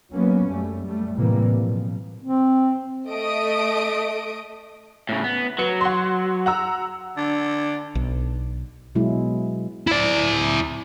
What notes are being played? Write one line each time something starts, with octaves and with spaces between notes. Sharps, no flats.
F#3 A#3 B3 C#4
F#2 G3 A3
G3 A3
A2 C3 E3 F#3 G3 A#3
B2 F3
C4
A3 D#5 E5 D#6 D7
A2 C#3
B3
F#3 B4 C#7
F#5 C6
F#5 A#5 E6
D3
B1
B2 F#3 G#3 E4
E4 D5